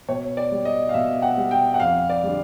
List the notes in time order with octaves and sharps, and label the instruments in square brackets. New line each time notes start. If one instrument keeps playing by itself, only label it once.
[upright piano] B2 C#5
D5
G3
D#5
F5
B2 E5
F#5
G3
G5
F#5
F2 F5
D5
D3 G3